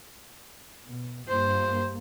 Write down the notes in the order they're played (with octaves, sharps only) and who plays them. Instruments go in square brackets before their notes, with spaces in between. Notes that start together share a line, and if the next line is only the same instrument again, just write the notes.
[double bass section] B2
[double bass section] G2 A#3 [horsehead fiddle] C5